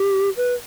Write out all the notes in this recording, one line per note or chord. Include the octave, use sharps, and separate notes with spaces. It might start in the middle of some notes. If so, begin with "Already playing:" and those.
Already playing: G4
B4